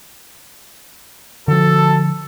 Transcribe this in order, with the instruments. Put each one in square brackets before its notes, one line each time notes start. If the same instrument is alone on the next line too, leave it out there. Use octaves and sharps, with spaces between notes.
[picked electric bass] D3 F3 [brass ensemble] F#4 A4